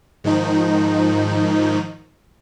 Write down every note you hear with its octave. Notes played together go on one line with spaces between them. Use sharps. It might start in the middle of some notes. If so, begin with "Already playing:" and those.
G#2 D#3 F3 D#4